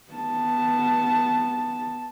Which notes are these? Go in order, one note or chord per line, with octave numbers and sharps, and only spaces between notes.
B3 A5